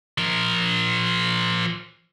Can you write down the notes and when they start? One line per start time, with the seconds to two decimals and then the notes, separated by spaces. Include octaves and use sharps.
0.18 F3 A#4